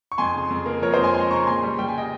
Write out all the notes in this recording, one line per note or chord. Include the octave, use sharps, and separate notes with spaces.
C#6
F2 G#5 C6
C#3
F2
A#3
F3 A#4 C#5
C5 D#5
F2
G#5 C6
G#3 G#5 C6
C#3 A#5 C#6
A#2 G#5 C6
G3
G3 G5
G#5
D#5 G5